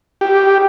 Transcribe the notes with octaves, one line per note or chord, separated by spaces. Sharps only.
G4